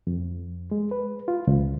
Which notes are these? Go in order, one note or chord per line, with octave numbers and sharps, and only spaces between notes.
F2
G#3
B4
F4
C#2